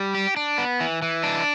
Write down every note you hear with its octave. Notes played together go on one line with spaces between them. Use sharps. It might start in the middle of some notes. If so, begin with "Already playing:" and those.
Already playing: G3
G4
D4
B3
E3
E3
D4